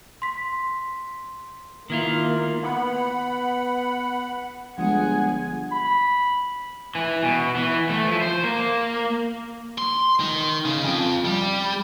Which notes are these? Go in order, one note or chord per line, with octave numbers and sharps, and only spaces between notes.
C6 B6
D#3 A#3 E4 F4
B3 F#5 B5
G1 F3 G#3 G#4 F#5 G#5
B5
E3
B2
E3
A3
F3
C5
A#3
C6
D#3
C#3
F2
G3